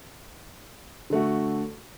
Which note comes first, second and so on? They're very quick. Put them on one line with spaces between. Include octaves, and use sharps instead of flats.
D3 A3 F#4